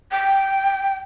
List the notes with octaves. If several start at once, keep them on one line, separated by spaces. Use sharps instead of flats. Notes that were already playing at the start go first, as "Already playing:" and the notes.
G5